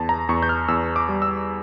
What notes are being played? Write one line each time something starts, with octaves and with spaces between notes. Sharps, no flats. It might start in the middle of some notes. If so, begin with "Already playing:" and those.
Already playing: E2 A5
A#5
E2 C#6
G6
F6
E2 E6
D6
G3
E6